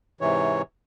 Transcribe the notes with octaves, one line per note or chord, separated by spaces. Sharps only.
G#2 C3 E3 C#5